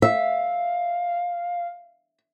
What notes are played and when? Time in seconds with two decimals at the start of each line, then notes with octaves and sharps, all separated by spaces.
0.02 E5 F5